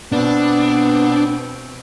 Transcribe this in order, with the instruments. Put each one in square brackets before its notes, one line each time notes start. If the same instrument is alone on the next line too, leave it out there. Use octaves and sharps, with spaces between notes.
[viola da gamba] B2 C4 [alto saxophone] B3 [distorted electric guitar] D4